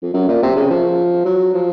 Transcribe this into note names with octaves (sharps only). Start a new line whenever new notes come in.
F2
F#2
A#2
C3
C#3
F3
F#3
F3